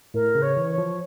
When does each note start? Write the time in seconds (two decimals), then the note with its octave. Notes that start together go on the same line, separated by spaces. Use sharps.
0.14 A2 A#4
0.35 C#3
0.42 C#5
0.57 E3
0.71 C#5
0.78 F3